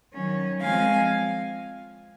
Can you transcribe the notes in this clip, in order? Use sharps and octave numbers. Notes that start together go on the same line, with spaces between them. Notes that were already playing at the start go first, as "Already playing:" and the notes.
D#3 F#3 C#4
F3 G#3 C4 F5 G#5